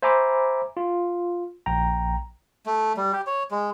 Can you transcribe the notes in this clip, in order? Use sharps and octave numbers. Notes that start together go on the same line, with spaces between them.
C5 E5 G#5 A#5 B5 D6
F4
A#1 G5 A#5
A3
G3
G4
C#5
G#3